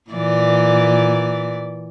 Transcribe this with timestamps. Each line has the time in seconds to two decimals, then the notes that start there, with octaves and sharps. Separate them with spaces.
0.10 A#2 E3 D5